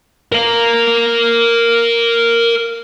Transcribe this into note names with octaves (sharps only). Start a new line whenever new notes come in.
A#4 F5